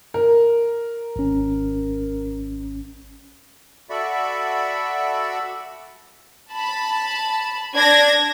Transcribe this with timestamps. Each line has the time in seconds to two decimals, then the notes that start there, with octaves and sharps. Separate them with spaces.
0.14 A#4
1.16 G#1 C#4
3.90 F#4 A4 D5 E5 B5 C#6
6.51 A5 B5
7.75 D4 G#6 A#6